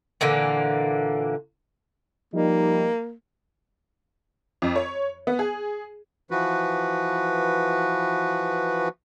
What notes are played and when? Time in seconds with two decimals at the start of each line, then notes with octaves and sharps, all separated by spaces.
0.21 A#2 D3 E3 A#3
2.34 F3 G3 A#3 D#4
4.62 F2
4.76 C#5
5.27 B3
5.39 G#4
6.31 E3 F3 F#4 B4